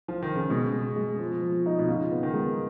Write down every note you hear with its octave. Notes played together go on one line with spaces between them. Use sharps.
F3
D#3
C#3
B2 G#3
G#3
G#3
F3
F3
D#4
B2
C#3 F4
B3
D#3
G#3